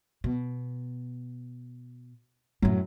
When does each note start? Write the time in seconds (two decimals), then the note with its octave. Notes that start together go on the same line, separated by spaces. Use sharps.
0.24 B2
2.62 F#2 A2 F#3